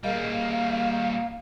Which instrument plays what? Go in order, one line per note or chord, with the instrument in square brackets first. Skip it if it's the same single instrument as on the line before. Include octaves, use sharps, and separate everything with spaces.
[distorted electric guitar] G3 A#3 [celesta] G#4 A#4 D#5 [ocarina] F5